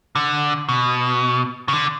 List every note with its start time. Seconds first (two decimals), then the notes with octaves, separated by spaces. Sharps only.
0.16 D3
0.69 B2
1.68 C#3
1.73 D3